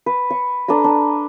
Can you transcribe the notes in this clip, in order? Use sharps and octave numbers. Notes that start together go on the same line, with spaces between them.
B4
C#6
D4 A4 B4 A#5
D4